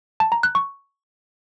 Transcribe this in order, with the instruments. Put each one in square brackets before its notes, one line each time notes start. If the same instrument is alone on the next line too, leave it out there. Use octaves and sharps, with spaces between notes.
[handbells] A5
A#5
F#6
C#6